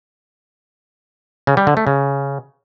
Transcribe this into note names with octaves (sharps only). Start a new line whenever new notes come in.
C#3
G3
D3
A3
C#3